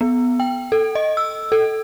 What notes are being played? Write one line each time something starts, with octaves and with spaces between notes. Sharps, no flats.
B3
G5
A4
D#5
E6
A4